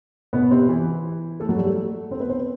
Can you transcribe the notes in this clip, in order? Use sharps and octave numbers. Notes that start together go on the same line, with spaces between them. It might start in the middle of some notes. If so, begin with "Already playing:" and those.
B2 B3
C3 C4
E3 E4
A3 A4
F#3 F#4
G3 G4
A3 A4
C4 C5
B3 B4
C4 C5